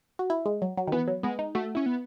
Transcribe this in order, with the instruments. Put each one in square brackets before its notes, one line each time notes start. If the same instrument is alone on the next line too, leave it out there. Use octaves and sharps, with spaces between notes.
[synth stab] F#4
E4
G#3
F#3
F#3
D#3
[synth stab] E3 [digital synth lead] B3
[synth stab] F#3
[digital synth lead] G#3 [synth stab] B3
[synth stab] D#4
[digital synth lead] A3 [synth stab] F#4
[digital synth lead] C#4 [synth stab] E4
[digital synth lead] B3